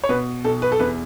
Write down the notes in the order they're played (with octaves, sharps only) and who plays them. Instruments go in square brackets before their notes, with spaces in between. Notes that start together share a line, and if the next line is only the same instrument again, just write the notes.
[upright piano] C#5
B2 B4
B1 A4
B4
A4
E2 B4